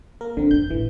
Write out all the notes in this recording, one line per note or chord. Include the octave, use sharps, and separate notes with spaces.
A#3 A#4
D3 F3 C4
F2 F3 G6
A1 C#3 E3